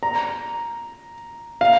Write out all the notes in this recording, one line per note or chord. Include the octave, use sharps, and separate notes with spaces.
A#5
F5